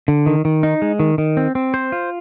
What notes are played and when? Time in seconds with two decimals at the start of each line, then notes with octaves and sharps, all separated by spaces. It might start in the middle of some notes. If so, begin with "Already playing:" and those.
0.08 D3
0.26 D#3
0.45 D#3
0.63 D#4
0.82 G#3
1.00 D#3
1.18 D#3
1.37 C4
1.55 C4
1.74 C5
1.92 F4